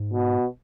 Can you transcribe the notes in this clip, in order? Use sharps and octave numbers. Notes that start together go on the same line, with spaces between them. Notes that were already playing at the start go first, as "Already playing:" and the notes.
Already playing: G#2
B2